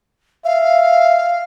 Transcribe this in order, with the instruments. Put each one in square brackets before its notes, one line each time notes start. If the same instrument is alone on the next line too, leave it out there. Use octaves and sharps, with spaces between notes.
[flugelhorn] E5 [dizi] F5